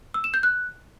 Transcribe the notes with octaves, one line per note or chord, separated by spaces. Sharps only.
E6
E7
G6
F#6